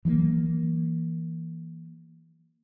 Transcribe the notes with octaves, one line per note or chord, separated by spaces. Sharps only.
E3 F#3 G#3 A#3